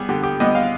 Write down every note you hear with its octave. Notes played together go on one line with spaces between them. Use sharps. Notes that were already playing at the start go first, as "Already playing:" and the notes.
Already playing: G3 B3 G#4
D3 G4
G4
G3 B3 D#5
F5